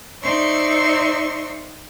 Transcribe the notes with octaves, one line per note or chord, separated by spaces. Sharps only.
D#4 C5 D5 E5 C6 C#6